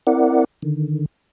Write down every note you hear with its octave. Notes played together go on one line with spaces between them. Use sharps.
C4 E4 A#4 D5 F#5
D3 D#3